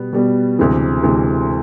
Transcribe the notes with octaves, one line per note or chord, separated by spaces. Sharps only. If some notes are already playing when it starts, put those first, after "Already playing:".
Already playing: B2 G3 B3
B2 G3 B3
D2 C3 E3 G#3
D2 C3 E3 G#3